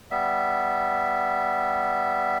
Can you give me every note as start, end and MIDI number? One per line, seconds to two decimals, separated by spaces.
0.11 2.38 55
0.11 2.38 59
0.11 2.38 76